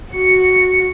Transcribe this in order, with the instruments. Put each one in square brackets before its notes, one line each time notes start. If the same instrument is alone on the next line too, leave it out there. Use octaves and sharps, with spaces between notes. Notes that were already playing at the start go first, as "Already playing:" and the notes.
[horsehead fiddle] F#4 [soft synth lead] C#7